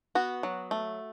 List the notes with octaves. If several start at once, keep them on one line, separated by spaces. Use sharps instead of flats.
B3 F#4
F#3
A3